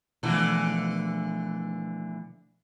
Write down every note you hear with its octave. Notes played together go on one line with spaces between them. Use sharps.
B2 D3 E3 F3 A3